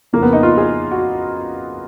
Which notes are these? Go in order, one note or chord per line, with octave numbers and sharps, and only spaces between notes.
F2 C#3 A#3
B3
D#4
F4
G#4
F#4